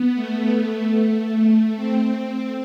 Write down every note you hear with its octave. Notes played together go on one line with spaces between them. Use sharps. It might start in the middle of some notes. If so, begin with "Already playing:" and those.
Already playing: B3
A3
A3
C4